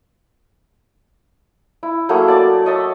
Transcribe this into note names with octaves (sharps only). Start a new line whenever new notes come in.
E4
F#3 A3 A#3 G#4
D5 A5 D6
C#5 D#5 E5 A5